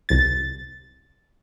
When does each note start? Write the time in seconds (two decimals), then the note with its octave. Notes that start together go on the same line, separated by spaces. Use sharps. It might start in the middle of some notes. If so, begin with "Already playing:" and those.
0.09 C2 A6